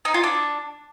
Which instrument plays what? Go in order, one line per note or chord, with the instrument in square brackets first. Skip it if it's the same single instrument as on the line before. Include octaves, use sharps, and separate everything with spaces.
[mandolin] D#4
F4
D4